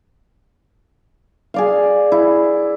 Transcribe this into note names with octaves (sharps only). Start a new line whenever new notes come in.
G#4 D5 F5
E4